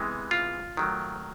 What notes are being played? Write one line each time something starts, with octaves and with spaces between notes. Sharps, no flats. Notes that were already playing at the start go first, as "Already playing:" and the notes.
Already playing: C3 E3 G#3 B3
F4
D#3 F#3 A3